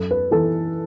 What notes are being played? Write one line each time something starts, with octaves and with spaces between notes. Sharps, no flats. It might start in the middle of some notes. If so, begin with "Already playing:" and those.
Already playing: F#2 A4
B4
E3 A4